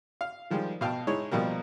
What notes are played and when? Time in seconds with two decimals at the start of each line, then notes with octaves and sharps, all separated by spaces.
0.21 F5
0.51 D#3 F3 G3 G#3
0.81 B2 F5 G5 A5
1.07 G#3 D#4 E4 C#5
1.31 B2 F3 G3 A#3